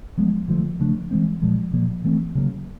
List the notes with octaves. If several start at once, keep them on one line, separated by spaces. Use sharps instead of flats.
F3 G#3 B3
D3 F3 A3
C#3 F3 A3 D4
E3 G#3 C4
A#2 F3 G#3
A#2 F3 A#3
E3 A3 C4
C#3 F#3 A#3